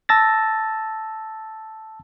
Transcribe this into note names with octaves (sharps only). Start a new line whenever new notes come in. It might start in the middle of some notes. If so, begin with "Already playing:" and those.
A5 E6 A6 A#6